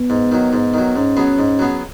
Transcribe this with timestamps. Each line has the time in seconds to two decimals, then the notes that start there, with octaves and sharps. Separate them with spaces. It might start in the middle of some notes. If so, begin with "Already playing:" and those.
Already playing: B3
0.10 G#2
0.32 D#3 F#3
0.53 G#2
0.74 D#3 F#3
0.96 G#2 C#4
1.17 F#3 B3 G#4
1.39 G#2
1.59 F#3 B3 G#4